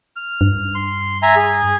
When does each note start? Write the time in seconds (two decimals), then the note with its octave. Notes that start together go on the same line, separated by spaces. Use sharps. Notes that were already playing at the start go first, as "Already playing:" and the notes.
0.16 F6
0.41 G2
0.75 C6
1.23 E5 G#5 A#5
1.36 G#4